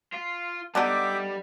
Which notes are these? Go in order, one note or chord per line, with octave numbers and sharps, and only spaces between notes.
F4
D3 G3 B3 D#4 E5 G5 D6